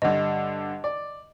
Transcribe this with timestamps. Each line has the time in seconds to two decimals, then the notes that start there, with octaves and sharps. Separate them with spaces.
0.02 G2 D3 D#5
0.84 D5